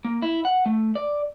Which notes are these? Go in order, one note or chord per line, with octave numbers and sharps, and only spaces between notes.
A#3
E4
F#5
A3
D5